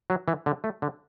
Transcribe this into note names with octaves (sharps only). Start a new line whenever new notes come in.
F#3
E3
D3
A3
D3